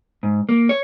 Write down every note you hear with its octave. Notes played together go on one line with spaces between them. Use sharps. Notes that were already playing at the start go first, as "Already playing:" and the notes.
G#2
A#3
C#5